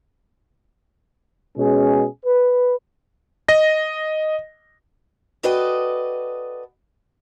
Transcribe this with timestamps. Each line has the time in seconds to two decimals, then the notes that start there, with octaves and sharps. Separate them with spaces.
1.57 B2 G#3 C#4 G#4
2.26 B4
3.48 D#5 A#6
5.43 F#4 A4 B4 D5 D#5 G5